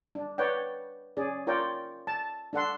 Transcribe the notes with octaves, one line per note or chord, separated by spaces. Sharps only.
D4
B4 C#5 D5 F#5 G5
C#4 G#4 D5
F4 A#4 C#5 D5 G5
A5
D4 A4 F#5 C6